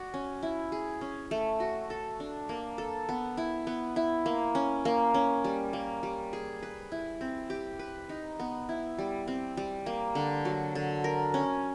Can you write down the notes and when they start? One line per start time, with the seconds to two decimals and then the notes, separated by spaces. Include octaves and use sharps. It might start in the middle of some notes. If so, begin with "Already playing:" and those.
Already playing: F#4 D5
0.14 C#4
0.42 E4
0.72 G#4
1.01 C#4
1.31 A3
1.60 F#4
1.90 A4
2.20 D4
2.49 A#3
2.78 A4
3.09 B3
3.37 E4
3.67 B3
3.96 E4
4.26 A#3
4.55 C#4
4.85 A#3
5.14 C#4
5.44 G3
5.73 A#3
6.03 G3
6.33 G#4
6.63 B4
6.92 E4
7.21 C4
7.50 G4
7.79 B4
8.09 D#4
8.40 B3
8.69 E4
8.99 G3
9.27 C4
9.57 G3
9.86 A#3
10.15 D3
10.45 F#3
10.75 D3
11.04 A#4
11.34 C#4